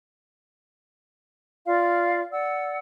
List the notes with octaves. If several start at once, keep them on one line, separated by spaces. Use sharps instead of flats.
F4 D5 F5
D5 F#5 E6